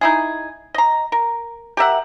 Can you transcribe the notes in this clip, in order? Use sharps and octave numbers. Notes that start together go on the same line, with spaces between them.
D#4 E4 G#4
D#5 A#5
A#4
G4 A#4 E5 F#5